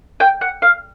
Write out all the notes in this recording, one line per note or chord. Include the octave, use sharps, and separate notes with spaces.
G5
F#5
F5